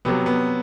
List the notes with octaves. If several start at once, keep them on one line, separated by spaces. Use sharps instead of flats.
C3 F#3 B3
B3